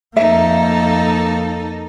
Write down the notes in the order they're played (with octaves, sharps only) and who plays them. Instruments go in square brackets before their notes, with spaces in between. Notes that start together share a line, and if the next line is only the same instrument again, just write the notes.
[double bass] F2 A#3 [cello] D#4 A4 [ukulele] E5